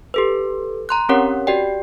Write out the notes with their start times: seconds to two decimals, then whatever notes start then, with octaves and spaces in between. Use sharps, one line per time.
0.14 G4 A4 B4
0.89 A#5 C6 F#6
1.09 C4 C#4 G4 A#4 C#5 F#5
1.47 F#4 G4 D5 G5